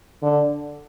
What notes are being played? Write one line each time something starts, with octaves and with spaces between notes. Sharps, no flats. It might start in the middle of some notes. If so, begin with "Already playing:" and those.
D3